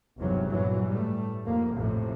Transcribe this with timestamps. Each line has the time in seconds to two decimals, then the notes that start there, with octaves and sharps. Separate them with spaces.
0.19 G1 E2 G#2 C3 F#3
0.48 G2 A#2 E3 F#3
0.87 A2 G3 A3
1.44 F1 F2 A#3
1.75 A1 F2 A2 C3